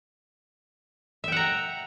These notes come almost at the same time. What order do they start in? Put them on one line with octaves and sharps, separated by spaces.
E5 G5 F#5 A#5